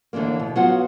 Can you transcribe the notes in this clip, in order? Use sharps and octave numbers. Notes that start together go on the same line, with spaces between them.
D#2 D3 E3 G#3 A#3
B2
F#3 B3 F4 F#5